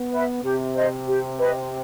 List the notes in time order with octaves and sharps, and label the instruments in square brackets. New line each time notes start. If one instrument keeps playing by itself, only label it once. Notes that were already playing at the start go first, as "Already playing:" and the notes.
Already playing: [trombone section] B3
[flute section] B4 E5
[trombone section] C3 [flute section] G4
[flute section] C5 D#5
G4
B4 D#5